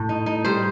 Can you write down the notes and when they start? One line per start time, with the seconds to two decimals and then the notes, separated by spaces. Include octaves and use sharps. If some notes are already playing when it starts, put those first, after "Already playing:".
Already playing: A2
0.09 D#4
0.26 D#4
0.45 G3 C5